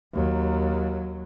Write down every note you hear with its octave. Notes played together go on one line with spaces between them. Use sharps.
D#2 F#3